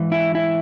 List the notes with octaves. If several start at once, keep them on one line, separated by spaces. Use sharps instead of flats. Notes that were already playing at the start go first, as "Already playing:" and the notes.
Already playing: G#2 E3
E4
E4